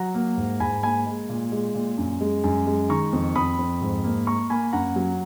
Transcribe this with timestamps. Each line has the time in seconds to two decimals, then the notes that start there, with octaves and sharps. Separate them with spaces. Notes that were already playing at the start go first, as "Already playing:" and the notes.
Already playing: F#3 F#5 A#5
0.14 A#3
0.37 G#2
0.60 G#2 G#5 B5
0.83 A#3 G#5 B5
1.06 G#3
1.29 A#2
1.52 G#3
1.75 A#2
1.98 F#2
2.21 G#3
2.44 F#2
2.67 G#3
2.89 D#3 A#5 C#6
3.13 F2
3.35 F2 B5 D#6
3.59 F2
3.81 G#2
4.04 A#3
4.27 A#3 A#5 C#6
4.50 A#3 G#5 B5
4.73 F#2 F#5 A#5
4.96 F#3